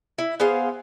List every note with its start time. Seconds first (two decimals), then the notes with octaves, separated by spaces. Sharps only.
0.18 E4
0.40 B3 G#4 C5 F5